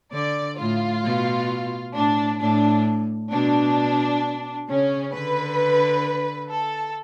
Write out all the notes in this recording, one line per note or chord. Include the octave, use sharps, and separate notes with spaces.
D3 D5
A2 F4
B2
A2 D4
A2 D4
B2 D4
C#3 C#4
D3 B4
A4